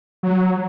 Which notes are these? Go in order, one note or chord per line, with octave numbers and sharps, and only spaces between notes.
F#3